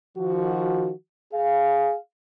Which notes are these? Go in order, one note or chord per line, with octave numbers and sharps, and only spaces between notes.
D#3 F3 F#4
G#4 F5